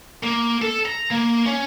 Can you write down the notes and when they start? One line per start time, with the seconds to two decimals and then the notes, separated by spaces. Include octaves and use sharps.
0.24 A#3
0.62 A4
0.85 A#5
1.11 A#3
1.46 C#4